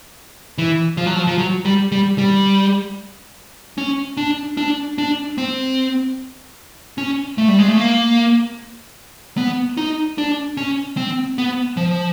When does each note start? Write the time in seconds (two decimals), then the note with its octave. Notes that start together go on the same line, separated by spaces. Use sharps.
0.58 E3
0.97 F3
1.06 F#3
1.14 F3
1.27 F3
1.38 F#3
1.65 G3
1.92 G3
2.18 G3
3.78 C#4
4.17 D4
4.57 D4
4.98 D4
5.38 C4
6.98 C#4
7.38 A3
7.48 G3
7.59 G#3
7.68 A3
7.77 A#3
9.37 B3
9.77 D#4
10.18 D4
10.57 C#4
10.97 C4
11.38 B3
11.77 F3